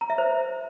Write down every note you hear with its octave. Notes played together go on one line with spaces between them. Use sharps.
A#5
E5
C5